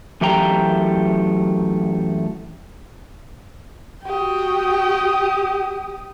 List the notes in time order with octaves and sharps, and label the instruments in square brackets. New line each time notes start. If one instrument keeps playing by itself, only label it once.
[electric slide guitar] F#2 E3 A3 G4 G5 A#5
[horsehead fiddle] F#4 G5 [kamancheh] G4 D#6